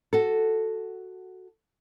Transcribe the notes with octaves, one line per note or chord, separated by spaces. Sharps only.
F#4 A4